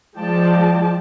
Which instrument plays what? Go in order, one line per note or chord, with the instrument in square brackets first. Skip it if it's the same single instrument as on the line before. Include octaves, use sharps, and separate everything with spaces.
[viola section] F3 G#3 F4 D5 G5 A5